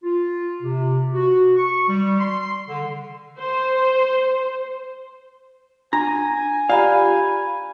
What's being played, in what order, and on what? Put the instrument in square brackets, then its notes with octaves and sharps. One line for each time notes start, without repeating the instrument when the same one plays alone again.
[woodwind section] F4
C3
F#4
C#6
G3
C6
D3
[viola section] C5
[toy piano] D4 [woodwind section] G#5 [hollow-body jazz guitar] A#5
[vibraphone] F4 G4 B5 [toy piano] D5 A#5 [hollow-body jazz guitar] F5